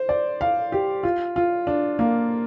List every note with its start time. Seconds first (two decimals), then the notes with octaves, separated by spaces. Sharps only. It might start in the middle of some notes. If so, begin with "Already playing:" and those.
Already playing: C5
0.09 D5
0.41 F5
0.72 G4
1.03 F4
1.36 F4
1.67 D4
1.99 A#3